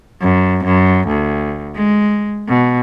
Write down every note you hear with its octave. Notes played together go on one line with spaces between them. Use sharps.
F#2
F#2
D2
G#3
B2